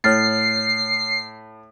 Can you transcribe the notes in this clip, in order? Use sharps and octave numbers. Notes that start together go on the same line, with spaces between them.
A2 C#5 F6 A6 C7